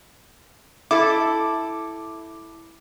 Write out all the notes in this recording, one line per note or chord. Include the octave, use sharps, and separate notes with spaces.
E4 A4 D6